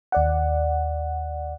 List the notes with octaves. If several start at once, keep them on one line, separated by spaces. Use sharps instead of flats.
D#2 D5 F#5